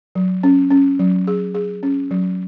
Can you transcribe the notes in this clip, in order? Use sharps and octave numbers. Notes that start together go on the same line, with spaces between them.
F#3
C#4
C#4
F#3
G#4
G#4
C#4
F#3